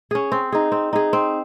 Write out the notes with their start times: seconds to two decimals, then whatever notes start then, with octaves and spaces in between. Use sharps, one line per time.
0.11 C#4 G#4
0.32 C4
0.52 D#4 G#4
0.72 C4
0.93 D#4 G#4
1.13 C4